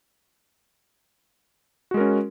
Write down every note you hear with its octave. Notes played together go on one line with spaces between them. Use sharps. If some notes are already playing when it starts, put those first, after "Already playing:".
G#3 C#4 F#4 A#4